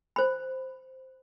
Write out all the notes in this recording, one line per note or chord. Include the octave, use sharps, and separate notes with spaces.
C5 B5